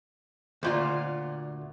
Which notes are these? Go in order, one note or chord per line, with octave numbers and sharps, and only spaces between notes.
D2 A#2 F4